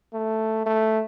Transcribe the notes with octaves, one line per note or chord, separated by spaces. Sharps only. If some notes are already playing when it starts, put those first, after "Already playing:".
A3
A3